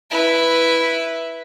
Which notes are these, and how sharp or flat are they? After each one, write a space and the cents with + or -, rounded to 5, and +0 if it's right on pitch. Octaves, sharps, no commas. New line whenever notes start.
E4 +0 B4 +0